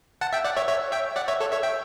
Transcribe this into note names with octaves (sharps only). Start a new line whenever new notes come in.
F#5 A5
E5 G5
D5 F#5
C#5 E5
C#5 E5
E5 G5
D5 F#5
C#5 E5
A4 C#5
C#5 E5
E5 G5